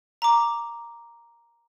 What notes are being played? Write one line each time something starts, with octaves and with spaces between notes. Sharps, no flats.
A#5 D6